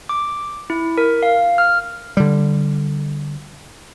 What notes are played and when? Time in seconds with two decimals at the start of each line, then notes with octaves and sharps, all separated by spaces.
0.09 D6
0.70 E4
0.98 A#4
1.23 F5
1.58 F6
2.17 D3 G3